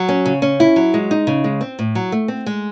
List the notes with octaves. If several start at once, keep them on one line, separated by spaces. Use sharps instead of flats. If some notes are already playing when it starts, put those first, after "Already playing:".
Already playing: F#3
C#4
C#3
C#4
E4
F#3
G#3
D#4
C#3
G#3
C4
A2
F#3
A3
C4
G#3